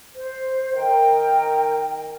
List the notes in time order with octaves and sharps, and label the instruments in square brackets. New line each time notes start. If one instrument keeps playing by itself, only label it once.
[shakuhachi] C5
[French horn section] D#3 D#4 A#4 [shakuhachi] G5